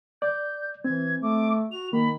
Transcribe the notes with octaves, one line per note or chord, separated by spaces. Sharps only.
D5 G6
E3 C4 G#6
A3 D6
F#4 F7
D#3 A#3 B5